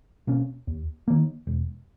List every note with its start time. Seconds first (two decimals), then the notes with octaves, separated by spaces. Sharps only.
0.27 B2 A#3 C#4
0.67 D#2
1.08 D#3 A#3
1.47 E1